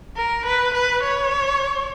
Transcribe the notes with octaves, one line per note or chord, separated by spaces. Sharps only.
A#4
B4
B4
C#5